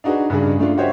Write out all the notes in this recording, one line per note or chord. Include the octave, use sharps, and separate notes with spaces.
D4 D#4 F#4 G#4 B4
G2 C#3 D4 G#4
A3 D4 F4
F#4 G4 C5 C#5 D#5 E5